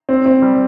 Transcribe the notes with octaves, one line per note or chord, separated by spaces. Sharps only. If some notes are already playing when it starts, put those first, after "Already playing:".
C4
C4
G3